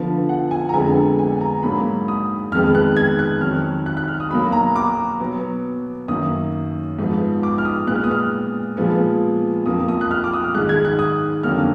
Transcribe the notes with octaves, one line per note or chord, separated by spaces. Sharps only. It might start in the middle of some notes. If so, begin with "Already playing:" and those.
Already playing: D3 F3 B3
F#5
G#5
A#5
F2 D3 G#3 B3 G#5
G#5
A#5
G#2 F#3 A#3 B5
D#6
F2 D#3 G#3 B3 F6
F#6
G#6
F#6
F2 D#3 F#3 F6
F#6
F#6
F6
D#6
B2 F#3 A#3 B5
A#5
D6
B2 F#3 B3
F#2 D#3 F#3 A#3 D#6
G#2 F3 B3
D6
F6
D#6
A#2 G#3 B3 F#6
F6
D#6
F6
A#2 F3 G#3 B3
F2 F3 A#3 D#6
D#6
F#6
F6
D6
D#6
F6
G#2 D#3 G#3 F#6
G#6
F#6
D#6
F2 D3 F#3 A#3 F6